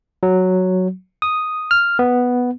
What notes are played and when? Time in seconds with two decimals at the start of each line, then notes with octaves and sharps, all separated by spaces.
0.23 F#3
1.22 D#6
1.71 F6
1.99 B3